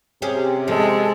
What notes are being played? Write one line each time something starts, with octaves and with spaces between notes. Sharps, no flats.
C3 C#4 G4 G#4
F3 G#3 A4